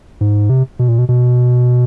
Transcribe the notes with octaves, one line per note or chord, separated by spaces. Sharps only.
G#2
C3
B2
A#2
B2
B2